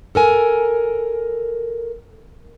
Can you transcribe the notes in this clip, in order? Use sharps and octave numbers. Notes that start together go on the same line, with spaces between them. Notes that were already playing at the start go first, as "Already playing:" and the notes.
A4 A#4 G#5